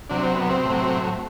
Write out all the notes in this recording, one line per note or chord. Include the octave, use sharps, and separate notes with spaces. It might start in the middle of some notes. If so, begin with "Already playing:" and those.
C3 F#3 D4
C4
B3
C3 C4
A2
F#3